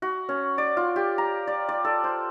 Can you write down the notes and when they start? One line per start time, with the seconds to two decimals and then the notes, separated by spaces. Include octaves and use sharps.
0.02 F#4
0.29 C#4
0.58 D5
0.77 F4
0.96 G4
1.18 A#5
1.47 D5
1.69 D5
1.85 A4
2.04 C5